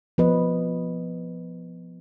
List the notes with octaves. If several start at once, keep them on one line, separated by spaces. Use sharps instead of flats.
F3 B3 B4 D#5